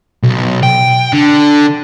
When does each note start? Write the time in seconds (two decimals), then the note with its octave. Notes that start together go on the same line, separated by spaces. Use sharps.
0.23 B1
0.63 G5
1.13 D3